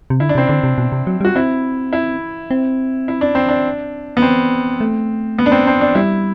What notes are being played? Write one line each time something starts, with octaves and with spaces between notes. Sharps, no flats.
C3
D3 E4
D4
C3 C4
D3 D4
C3
B2
C3
F#3
G3 F#4
C4 E4
E4
C4
E4
D4
C4
D4
B3
C4
A3
B3
D4
C4
C4
D4
G3 E4